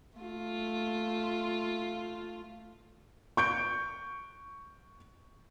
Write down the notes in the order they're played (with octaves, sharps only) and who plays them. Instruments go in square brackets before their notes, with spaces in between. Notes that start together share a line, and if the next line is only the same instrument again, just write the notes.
[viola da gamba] A3 F4
[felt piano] C#6 G6 D7